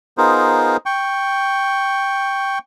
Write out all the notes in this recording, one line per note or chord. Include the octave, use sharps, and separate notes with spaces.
B3 D#4 F4 G#4 A#4 C5
G5 C#6